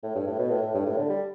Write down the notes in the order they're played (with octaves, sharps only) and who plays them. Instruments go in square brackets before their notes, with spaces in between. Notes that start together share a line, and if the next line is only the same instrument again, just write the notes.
[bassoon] A2
G2
A2
B2
A2
A2
G2
A2
D3
G3